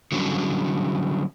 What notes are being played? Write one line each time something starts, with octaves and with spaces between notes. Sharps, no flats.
D3 F#3 G3 B3 C#4